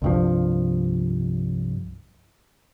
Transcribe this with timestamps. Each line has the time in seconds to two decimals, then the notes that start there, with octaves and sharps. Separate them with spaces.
0.02 C2 G2 F3